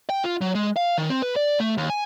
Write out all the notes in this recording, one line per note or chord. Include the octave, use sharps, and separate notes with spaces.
G5
F4
F#3
G#3
F5
D#3
C4
B4
D5
A3
D#2
G#5